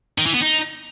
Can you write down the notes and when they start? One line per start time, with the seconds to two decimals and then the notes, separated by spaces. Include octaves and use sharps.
0.18 D#3
0.26 E3
0.34 B3
0.42 D#4